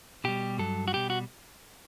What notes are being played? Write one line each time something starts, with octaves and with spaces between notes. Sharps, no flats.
B2 G3 G4
G2 F#3 A4
F#4
B2 G3 G4
F#4